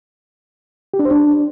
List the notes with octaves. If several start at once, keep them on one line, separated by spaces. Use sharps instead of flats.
G4
D4
C5
D4